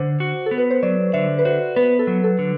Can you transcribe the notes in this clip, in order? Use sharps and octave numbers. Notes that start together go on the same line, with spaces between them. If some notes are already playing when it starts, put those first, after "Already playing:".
Already playing: D3 C5
F#4
A4
B3
B4
C5
F#3 D5
D3 E5
B4
F#4 C5
B3 B4
A4
F#3
A4
D3